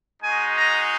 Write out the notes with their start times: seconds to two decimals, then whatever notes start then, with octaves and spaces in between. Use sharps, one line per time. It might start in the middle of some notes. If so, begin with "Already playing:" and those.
0.23 G#3 D#4 F#4 G#5
0.57 A#5